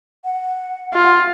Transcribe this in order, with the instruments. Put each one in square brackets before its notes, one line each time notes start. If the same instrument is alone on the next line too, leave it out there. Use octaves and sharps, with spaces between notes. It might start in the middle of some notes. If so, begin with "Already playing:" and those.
[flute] F#5
[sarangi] F4